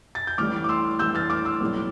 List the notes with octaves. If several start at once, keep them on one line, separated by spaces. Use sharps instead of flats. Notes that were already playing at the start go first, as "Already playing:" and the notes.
A6
G6
A1 A2 E3 G3 D6 F6
D6
C6 E6
A1 A2 E3 G3 E6 G6
F6 A6
D6 F6
C6 E6
B1 A2 G3